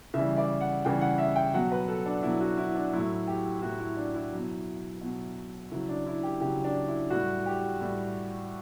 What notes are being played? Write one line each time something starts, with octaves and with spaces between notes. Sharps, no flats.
C#3 E3 G3 E5
D5
F#5
C#3 E3 G3 G5
F#5
E5
G5
B2 F#3 F#5
B4
A4
D4
B2 F#3 E4
F#4
E4
D4
A2 F#3 E4
G4
A2 F#3 F#4
E4
D4
E4
B2 F#3
B2 F#3
C#3 F#3 E4
D4
E4
G4
C#3 F#3 G4
D4
E4
A2 G3 F#4
G4
A2 G3